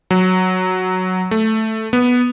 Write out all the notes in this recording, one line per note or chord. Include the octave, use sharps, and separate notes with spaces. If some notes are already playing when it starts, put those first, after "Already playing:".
F#3
A3
B3